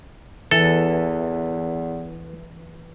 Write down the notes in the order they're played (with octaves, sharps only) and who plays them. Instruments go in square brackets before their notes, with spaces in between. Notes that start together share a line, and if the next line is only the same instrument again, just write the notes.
[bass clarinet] E2 [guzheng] E3 [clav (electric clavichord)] A4